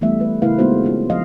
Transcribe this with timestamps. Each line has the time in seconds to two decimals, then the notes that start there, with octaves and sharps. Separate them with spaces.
0.01 E3 G3 A3 B3 E5
0.20 A3 B4
0.42 C#3 A3 E4 A#4 B4 F5
0.58 G#3 A#3 B3 D#4 F#4 C5
0.84 B3 C#4 F4
1.10 F3 D#5 F5